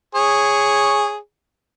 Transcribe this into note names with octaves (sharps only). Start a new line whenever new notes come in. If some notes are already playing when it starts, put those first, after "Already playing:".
G#4 C#5